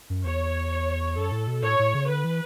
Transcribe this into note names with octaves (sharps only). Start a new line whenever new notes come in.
F#2
E2 C#5
F#2 A4
A2
B2
A2 C#5
A2
C#3
D3 B4
E3